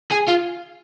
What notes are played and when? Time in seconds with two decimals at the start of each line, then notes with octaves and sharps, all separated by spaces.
0.11 G#4
0.28 F4